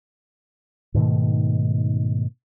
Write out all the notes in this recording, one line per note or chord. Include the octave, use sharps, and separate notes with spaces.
G#2 B2 D#3 A3